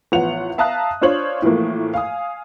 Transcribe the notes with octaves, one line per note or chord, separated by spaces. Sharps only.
A1 F3 B3 F#5 F7
E5 F5 A5 A#5 D#6 F#6
D4 F4 C5 C#5 F#7
A2 E3 F3 A3 A#3
F5 G#5 D#6